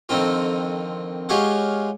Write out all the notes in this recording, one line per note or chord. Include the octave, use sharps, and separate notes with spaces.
F2 D3 D#3 C4 F4
G#3 F4 G4 C#5 F5 F#5